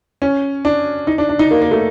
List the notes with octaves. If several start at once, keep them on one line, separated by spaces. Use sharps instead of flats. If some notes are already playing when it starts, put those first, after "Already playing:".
C#4
D4
D#4
D4
D4
D#4
A#3
A#3
A3